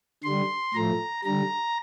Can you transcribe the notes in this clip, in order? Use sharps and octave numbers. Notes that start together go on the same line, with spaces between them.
D3 G3 C6
A2 F3 A3 A#5
D3 G3 A#5